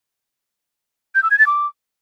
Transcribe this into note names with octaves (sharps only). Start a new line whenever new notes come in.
G6
E6
G#6
A6
D6